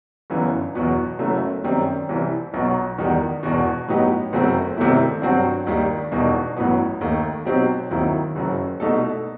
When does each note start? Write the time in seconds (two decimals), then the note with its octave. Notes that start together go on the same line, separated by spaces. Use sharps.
0.30 G1 F#2 E3 B3
0.75 E2 B2 F#3 B3
1.19 F#1 F#2 F#3 A3
1.64 F#2 D#3 G3 C4
2.09 C2 C3 E3
2.54 B1 B2 F#3
2.98 E2 D#3 G3 B3
3.43 E1 E2 B2
3.88 A2 F#3 B3 D#4 G4
4.33 F#1 F#2 F#3 A3 C4
4.77 C2 C3 D#3 A3 E4
5.22 G2 F#3 C4 F#4
5.67 D#2 D#3 G3
6.11 E1 E2 B2 G3 D#4
6.57 A1 A2 F#3 B3
7.01 D#2 D#3 A3
7.46 B2 F#3 C4 D#4 G4
7.91 D#2 D#3 F#3 C4 E4
8.36 F#1 F#2 F#3
8.80 C2 B2 A3 D#4 A4